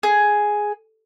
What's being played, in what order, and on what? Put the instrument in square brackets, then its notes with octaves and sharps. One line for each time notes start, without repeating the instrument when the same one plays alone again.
[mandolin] G#4